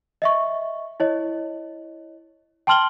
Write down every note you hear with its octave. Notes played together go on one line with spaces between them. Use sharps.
D#5 E5 C#6
E4 C#5 D#5
G5 A5 C6 F6 F#7 G7